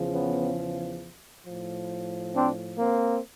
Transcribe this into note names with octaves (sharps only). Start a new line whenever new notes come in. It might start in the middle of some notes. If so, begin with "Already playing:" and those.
Already playing: E2 C#3 F3
B3 C#4
A2 F3
C4 D4
A#3 C4